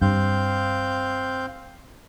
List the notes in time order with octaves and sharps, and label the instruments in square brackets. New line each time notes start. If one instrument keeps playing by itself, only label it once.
[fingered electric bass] G2 [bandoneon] C4 F5 G6